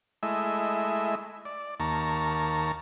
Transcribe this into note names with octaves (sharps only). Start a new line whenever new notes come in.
G#3 A3 E4 D#5 E5
D5
D#2 A#3 A5 A#5 C#6